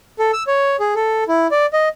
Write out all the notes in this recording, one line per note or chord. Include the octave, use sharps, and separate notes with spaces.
A4
E6
C#5
G#4
A4
E4
D5
D#5